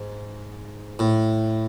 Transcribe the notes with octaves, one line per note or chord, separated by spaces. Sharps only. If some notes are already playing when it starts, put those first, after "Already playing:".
Already playing: G#2
A2